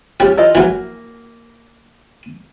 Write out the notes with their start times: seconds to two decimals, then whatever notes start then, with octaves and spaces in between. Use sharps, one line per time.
0.20 G3 C#4 F4 G4
0.37 E3 F4 D#5
0.55 E3 F#3 A#3